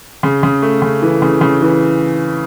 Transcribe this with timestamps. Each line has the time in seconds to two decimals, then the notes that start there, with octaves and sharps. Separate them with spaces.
0.23 C#3
0.43 C#3
0.62 A3
0.82 C#3
1.02 E3
1.22 C#3
1.41 C#3
1.61 E3